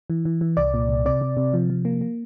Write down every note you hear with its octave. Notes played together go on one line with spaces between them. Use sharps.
E3
E3
E3
C2 D5
A#2
C2
C3 D5
C3
C3
F3
F3
A#3
A#3